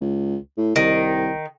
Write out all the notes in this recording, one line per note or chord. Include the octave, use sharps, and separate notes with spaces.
C#2
A2
C2 D#3